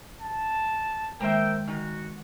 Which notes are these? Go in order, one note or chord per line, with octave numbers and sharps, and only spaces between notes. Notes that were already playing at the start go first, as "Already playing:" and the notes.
A5
D#3 G#3 A#3 C5 E5 G5
D#3 F#4 G#5